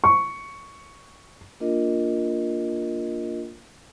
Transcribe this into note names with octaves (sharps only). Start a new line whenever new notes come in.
C#6
A#3 D4 F4 A#4 D#5